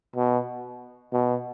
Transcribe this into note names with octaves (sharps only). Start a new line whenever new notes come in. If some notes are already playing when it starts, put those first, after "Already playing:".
B2
B2